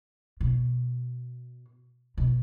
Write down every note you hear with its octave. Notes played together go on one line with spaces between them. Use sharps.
B2
B2